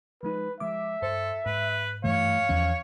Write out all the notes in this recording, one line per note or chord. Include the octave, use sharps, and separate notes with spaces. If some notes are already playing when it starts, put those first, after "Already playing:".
F3 G#3 D#4 B4
F3 G#3 E5 D6
G2 A4 C5
G#2 B4
G2 E3 A3 C#5 F5
E2 F3 C#4